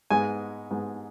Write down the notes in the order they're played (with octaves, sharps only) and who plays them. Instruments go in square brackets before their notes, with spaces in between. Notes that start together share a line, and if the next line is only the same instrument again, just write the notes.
[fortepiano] G#2 G#3 B3 G#5
G#2 G#3 B3